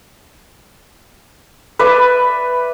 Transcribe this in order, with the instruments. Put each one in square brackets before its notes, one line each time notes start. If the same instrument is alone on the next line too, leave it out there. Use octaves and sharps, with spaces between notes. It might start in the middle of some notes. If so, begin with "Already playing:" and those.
[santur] B4 D5 E5 B5